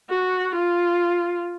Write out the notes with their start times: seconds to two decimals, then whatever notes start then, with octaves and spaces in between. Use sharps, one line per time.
0.10 F#4
0.55 F4